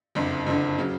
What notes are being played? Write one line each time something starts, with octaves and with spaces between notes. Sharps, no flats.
F#1 F2 D3
F#1 F2 D3
C#3 F#3